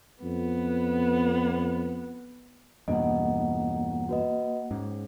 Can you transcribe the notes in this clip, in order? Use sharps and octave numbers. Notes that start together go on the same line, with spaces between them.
F2 B3
E2 G2 B2 A#3 D#5 F#5
F#4 B4 D#5
G#2 C#4